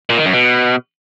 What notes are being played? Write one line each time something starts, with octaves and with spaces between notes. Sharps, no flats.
A#2
D#3
F#2
B2